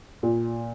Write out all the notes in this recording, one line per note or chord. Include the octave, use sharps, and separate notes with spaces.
A#2